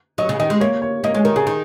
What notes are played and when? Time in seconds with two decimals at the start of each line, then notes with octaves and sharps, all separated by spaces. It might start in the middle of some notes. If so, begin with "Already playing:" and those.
0.18 F#3 D#5
0.29 C#3
0.39 D#3 D#5
0.50 G#3
0.61 A#3 C#5
0.82 C#5
1.04 A#3 D#5
1.14 G#3 C#5
1.25 D#3 A#4
1.36 C#3 G#4
1.47 D#3